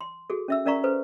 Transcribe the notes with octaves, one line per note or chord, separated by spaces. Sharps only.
C6
F#4 G#4 A4
C#4 E5 E6
C#4 A#4 D5 F5 A#5 C#6
A4 B4 C5